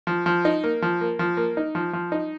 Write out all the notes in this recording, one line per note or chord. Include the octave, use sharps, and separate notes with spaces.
F3
F3
D#4
A#3
F3
A#3
F3
A#3
D#4
F3
F3
D#4